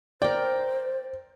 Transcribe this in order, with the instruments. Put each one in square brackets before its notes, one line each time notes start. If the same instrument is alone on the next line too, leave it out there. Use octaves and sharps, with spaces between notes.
[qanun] A#4 G5 [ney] C5 [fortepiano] D5